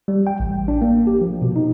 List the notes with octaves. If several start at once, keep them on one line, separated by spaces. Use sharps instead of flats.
G3
G5
A1
D4
A#3
G4
F3
B2
D#4